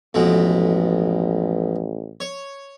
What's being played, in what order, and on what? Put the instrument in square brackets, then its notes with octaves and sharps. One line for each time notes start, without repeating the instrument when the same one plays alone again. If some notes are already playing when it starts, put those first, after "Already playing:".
[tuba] A1 [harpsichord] F2 B2 G#3
[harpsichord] C#5